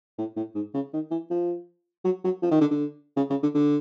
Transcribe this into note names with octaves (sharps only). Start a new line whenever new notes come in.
A2
A2
G#2
C#3
D#3
E3
F3
F#3
F#3
F3
D#3
D3
D3
C#3
C#3
D3
D3